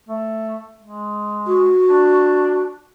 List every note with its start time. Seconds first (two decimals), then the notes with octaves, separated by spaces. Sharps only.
0.09 A3
0.83 G#3
1.47 F#4
1.90 D4